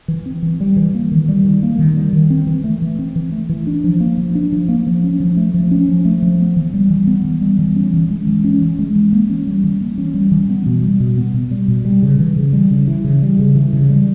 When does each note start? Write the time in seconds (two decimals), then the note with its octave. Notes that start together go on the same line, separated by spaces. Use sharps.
0.08 E3
0.26 C4
0.43 E3
0.60 G3
0.77 E3
0.95 A#3
1.12 D#3
1.29 G3
1.45 D#3
1.63 A#3
1.79 D#3
1.97 G3
2.13 D#3
2.30 C4
2.47 E3
2.64 A3
2.82 E3
2.99 C4
3.16 E3
3.32 A3
3.49 E3
3.67 D4
3.84 F3
4.01 A#3
4.18 F3
4.35 D4
4.52 F3
4.69 A#3
4.87 F3
5.04 C#4
5.20 F3
5.37 A3
5.54 F3
5.71 C#4
5.89 F3
6.05 A3
6.22 F3
6.40 B3
6.56 E3
6.74 G3
6.90 E3
7.07 B3
7.25 E3
7.42 G3
7.59 E3
7.76 C#4
7.94 E3
8.10 G#3
8.27 E3
8.44 C#4
8.62 E3
8.79 G#3
8.96 E3
9.13 A#3
9.30 C#4
9.47 G3
9.64 E3
9.81 A#3
9.98 C#4
10.14 G3
10.32 E3
10.49 B3
10.66 B2
10.83 G3
11.00 B2
11.17 B3
11.34 B2
11.51 G3
11.68 B2
11.85 G3
12.02 C#3
12.20 E3
12.36 C#3
12.53 G3
12.71 C#3
12.87 E3
13.04 C#3
13.22 G3
13.39 C#3
13.55 E3
13.73 C#3
13.90 G3